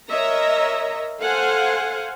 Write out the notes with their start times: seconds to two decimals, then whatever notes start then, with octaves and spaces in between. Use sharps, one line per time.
0.10 A#4 C#5 D#5 E5 A#5
1.22 A4 C5 F5 F#5 G#5